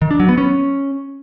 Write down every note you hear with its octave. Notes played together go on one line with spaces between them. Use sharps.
D#3
D4
F#3
B3
C#4